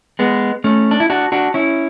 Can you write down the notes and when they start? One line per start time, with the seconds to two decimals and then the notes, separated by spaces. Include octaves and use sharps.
0.19 G#3 B3
0.64 A3 C#4
0.91 D4
1.00 E4
1.10 D4 F#4
1.32 D4 F#4
1.54 C#4 E4